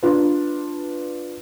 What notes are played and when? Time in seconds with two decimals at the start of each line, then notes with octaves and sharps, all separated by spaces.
0.03 D4 F4 B4